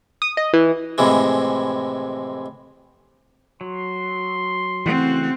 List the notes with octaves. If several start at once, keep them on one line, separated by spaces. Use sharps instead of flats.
D#6
D#5
E3
F2 A2 C3 E3 G#3
F#3 C6
C#3 E3 A3 C4 F#4 F#5